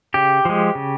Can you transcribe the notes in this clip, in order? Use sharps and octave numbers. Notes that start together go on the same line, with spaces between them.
C#3 G4
F3 G#3
C#3